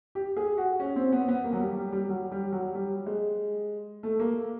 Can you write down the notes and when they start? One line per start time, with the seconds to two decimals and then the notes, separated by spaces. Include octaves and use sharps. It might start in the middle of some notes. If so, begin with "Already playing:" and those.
0.15 G4
0.36 G#4
0.57 F#4
0.80 C#4
0.96 C4
1.12 B3
1.28 B3
1.44 A#3
1.53 F#3
1.60 G3
1.77 G3
1.93 G3
2.09 F#3
2.32 G3
2.52 F#3
2.75 G3
3.06 G#3
4.03 A3
4.19 A#3